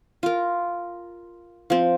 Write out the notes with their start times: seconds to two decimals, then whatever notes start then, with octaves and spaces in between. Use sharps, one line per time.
0.23 F4 A#4
1.70 F3 C4